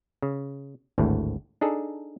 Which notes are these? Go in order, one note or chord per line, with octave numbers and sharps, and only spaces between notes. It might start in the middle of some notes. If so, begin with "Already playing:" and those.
C#3
G#1 D2 A2
D4 D#4 G#4 A4